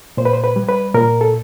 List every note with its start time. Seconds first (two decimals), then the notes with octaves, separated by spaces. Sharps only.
0.17 A#2 C5
0.25 B4
0.33 C5
0.44 B4
0.56 G3
0.69 B4
0.94 A#2 A#4
1.21 A4